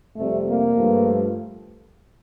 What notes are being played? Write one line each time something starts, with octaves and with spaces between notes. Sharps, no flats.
F2 C3 G3 A3
A#3
G2 F3 A3